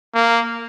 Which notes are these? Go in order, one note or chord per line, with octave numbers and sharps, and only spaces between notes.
A#3